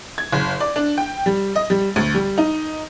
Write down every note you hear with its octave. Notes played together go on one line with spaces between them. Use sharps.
G#6
F#1
D5
D4
G5
G3
D#5
G3
D2
G3
D#4